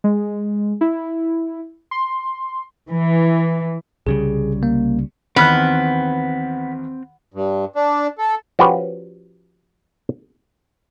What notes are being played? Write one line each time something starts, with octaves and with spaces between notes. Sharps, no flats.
G#3
E4
C6
E3
C2 C#3 G3 G#4
A#3
D#2 D#3 E3 B3 C4 F6 F#6
G2
D4
A4
F3 C#4 F#4 G4 B4